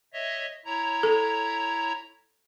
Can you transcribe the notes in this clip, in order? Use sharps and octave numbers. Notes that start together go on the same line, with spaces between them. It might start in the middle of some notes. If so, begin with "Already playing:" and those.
C#5 D#5 E5
E4 C#5 A#5
A4